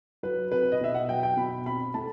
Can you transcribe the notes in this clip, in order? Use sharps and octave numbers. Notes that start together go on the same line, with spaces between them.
F#3 B4
C4 B4
D#5
B2 E5
F#5
F#3 G5
G5
B2 B5
C4 B5
A3 A5